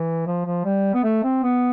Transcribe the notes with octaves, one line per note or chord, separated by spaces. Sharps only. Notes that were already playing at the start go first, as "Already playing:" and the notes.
Already playing: E3
F3
F3
G3
B3
A3
C4
B3